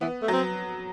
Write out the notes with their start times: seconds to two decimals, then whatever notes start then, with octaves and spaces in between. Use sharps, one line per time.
0.01 E3 B3
0.22 A3
0.28 F#3 C4